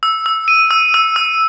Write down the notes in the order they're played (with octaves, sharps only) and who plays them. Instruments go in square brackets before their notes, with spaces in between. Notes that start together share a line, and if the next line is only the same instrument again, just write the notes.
[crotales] E6
E6
D#7
E6
E6
E6